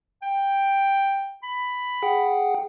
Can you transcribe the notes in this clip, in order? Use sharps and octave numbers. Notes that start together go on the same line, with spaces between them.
G5
B5
G#4 F#5 G5